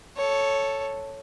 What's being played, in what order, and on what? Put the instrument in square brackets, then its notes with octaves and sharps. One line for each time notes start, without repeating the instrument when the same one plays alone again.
[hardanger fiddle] A4 C#5